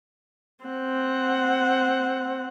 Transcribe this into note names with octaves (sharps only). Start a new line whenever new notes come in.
C4 F#5